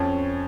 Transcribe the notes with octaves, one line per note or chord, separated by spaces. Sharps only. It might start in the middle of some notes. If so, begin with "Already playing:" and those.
Already playing: F2 F3 C#4